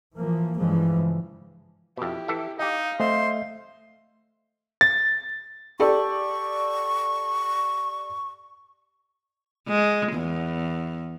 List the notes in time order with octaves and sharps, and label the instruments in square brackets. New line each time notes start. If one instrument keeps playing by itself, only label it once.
[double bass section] E3 F3 A#3
G2 C#3 E3 F3 G3 G#3
[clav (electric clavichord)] F2 B2 [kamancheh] E4 G4
[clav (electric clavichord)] E3 A4 E5
[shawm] D#4 [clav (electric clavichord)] G4 D#5 [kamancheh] F5
[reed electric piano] A3 D#5 E5 [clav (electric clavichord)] C4 [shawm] C5
[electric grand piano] A6
[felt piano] G4 A4 D5 [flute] C#6
[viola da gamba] G#3
E2